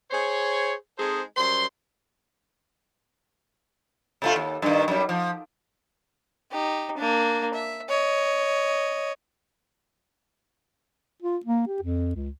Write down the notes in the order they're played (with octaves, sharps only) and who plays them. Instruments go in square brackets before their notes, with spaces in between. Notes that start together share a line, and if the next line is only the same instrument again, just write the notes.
[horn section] G#4 C5 C#5
G#3 C4 D#4 G#4 A4 C5
F#2 G3 C5 C6
[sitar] C3 A3 F4
D#2
G2 D#3
F#2 G3
F3
[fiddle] D#4 G4
A#3 D4
E5
C#5 D#5
[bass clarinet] F4
A#3
G4
F2
C#2